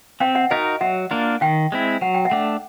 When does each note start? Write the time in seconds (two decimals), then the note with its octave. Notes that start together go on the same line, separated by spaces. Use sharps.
0.20 C4 F5 G5
0.35 E5 F#5
0.51 D#4 F#4 A#4 D#5 F5
0.81 F#3 E5 F#5
1.11 A#3 D4 F4 A#4
1.41 D#3 F5 G5
1.72 G#3 C4 E4
2.01 F#3 F#5
2.14 G5
2.25 E5 F#5
2.31 A3 D4